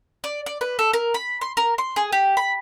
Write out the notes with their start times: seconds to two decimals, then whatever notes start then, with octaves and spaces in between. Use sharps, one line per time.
0.24 D5
0.46 D5
0.61 B4
0.79 A4
0.93 A#4
1.14 B5
1.41 C6
1.57 A#4
1.78 C6
1.96 G#4
2.12 G4
2.37 B5